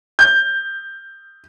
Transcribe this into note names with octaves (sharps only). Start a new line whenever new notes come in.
G6